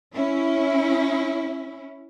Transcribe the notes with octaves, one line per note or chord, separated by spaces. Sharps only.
C#4 E4